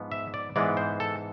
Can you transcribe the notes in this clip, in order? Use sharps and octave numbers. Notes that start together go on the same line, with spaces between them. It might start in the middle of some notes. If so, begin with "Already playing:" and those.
Already playing: G#2 F3 B3
E5
D5
G#2 E3 G#3 B3 D5
C5
A4